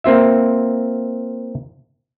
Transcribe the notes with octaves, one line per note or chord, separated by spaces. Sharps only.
A#3 C4 F4 E5